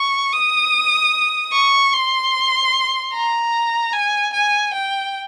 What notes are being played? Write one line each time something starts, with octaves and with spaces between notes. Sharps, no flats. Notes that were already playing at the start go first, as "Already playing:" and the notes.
Already playing: C#6
D#6
C#6
C6
A#5
G#5
G#5
G5